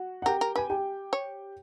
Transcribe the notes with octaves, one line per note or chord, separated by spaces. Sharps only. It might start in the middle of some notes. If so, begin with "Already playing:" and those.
Already playing: F#4
F#5
G4 A#4 G5
A#4
B4 G#5
G4 G5
C#5